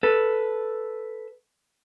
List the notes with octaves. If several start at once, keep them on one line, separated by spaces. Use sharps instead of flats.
A4 B4